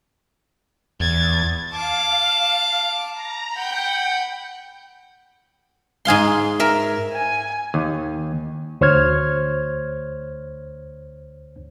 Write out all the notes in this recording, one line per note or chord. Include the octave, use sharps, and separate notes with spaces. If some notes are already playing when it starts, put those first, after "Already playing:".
E2 G#6 A6
F5 A5 D6
A#5
F#5 G5 B5 G6
G#2 G#4 F5 C6
A#4 E5
G#5
D#2
D2 C5 C#5 F6 G#6